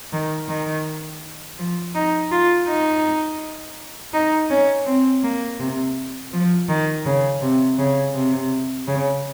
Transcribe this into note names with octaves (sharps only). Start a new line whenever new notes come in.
D#3
D#3
F3
D#4
F4
D#4
D#4
C#4
C4
A#3
C3
F3
D#3
C#3
C3
C#3
C3
C#3